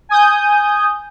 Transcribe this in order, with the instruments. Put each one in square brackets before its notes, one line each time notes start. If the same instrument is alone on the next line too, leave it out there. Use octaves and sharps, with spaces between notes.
[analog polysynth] G#5 D#6 G6